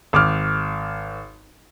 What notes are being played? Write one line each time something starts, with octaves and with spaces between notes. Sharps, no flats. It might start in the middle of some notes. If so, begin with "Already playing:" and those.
G#1 D6 F6